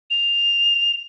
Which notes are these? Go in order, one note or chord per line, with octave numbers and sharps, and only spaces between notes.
F7